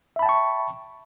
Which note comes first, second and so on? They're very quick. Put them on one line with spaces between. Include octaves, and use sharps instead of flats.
E5 B5 A5 G5 C#6